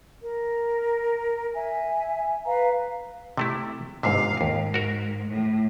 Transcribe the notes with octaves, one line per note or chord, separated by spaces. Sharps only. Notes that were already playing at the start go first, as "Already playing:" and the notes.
A#4
E5 G#5
B4 F5 A#5
C3 A3 E4
G1 G#2 C3 F5
D#2 G#2
F#4 A#4
A2